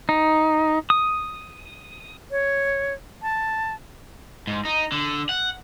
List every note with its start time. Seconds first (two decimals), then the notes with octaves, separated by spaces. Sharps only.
0.09 D#4
0.90 D#6
2.31 C#5
3.22 A5
4.47 G#2
4.65 D#4
4.92 D3
5.29 F#5